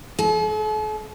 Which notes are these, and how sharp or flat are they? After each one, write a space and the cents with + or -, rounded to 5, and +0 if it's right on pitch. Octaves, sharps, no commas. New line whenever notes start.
A4 -45